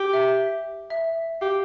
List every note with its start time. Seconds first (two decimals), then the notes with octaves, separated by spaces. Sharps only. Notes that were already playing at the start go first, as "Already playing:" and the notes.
Already playing: G4
0.13 E5
0.90 E5
1.41 G4 F5